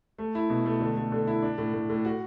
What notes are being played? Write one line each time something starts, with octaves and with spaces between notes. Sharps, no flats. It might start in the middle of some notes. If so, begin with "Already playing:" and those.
A3
E4
B2
A3
D3
A3
D3
E4
D4
A2
A2
A2
F#4